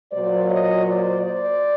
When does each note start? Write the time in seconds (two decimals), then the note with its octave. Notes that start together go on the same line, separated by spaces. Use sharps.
0.12 A#2 F#3 C5 D5
0.48 C#5 D#5
0.85 C5 D5
1.20 C5 D5